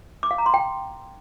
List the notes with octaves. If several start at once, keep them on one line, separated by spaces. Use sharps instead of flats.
D6
F5
A#5
C6
G5